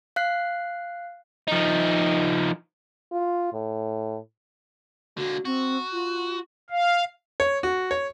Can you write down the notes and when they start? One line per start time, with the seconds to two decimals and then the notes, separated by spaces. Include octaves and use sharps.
0.16 F5 F#6 C7
1.48 F3 D#4
3.12 F4
3.53 A2
5.17 D3 A#3 F#4
5.45 C4 F#4
5.92 F4
6.70 F5
7.40 C#5
7.63 F#4
7.91 C#5